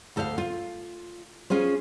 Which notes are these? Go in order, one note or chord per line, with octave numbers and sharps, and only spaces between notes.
D2 A4 C5 E5 F5
F4
C#4 F4 G#4 C5